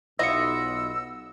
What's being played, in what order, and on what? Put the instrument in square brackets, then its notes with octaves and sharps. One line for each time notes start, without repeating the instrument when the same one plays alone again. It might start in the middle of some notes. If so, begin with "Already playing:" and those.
[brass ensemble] B1 [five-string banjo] B3 E4 F4 [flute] E6 [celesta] A#6 C#7